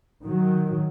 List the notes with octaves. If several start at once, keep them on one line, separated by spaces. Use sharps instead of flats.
D#3 F#3